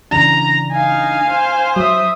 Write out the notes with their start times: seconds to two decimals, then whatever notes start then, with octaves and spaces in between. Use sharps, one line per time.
0.11 C#3 E3 D4 A#5
0.72 D#4 F5 G#5
1.30 C5
1.76 F#3 E5 D#6